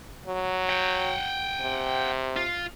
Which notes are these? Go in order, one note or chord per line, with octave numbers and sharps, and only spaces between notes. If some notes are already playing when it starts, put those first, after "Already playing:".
F#3
F#5 G5
C3
F4